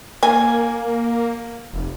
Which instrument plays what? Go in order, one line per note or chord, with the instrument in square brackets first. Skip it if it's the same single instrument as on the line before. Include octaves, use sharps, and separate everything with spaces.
[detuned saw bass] A#3 [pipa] G#5
[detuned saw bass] F1